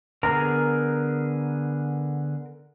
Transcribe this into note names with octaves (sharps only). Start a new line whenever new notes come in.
D3 B3 G#4 A#4 A#5